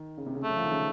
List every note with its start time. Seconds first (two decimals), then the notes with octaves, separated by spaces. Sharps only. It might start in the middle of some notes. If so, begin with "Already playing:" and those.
Already playing: D#3
0.18 C#3
0.26 C3
0.35 C#3
0.43 A3
0.50 F#3
0.57 F3
0.64 D#3
0.71 C#3